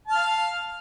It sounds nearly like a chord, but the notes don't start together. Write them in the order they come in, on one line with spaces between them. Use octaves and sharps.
A5 F6 F5